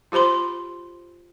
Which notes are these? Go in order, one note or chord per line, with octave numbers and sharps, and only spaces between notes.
F4 G4 C5 B5 C6